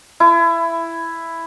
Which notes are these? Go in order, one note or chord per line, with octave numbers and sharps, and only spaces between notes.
E4